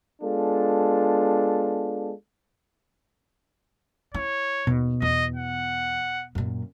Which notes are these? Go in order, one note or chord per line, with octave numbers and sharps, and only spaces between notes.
G#3 B3 D4 F4 A4
E4 C#5
D#2 B2
E2 D#5
F#5
F#2 A#2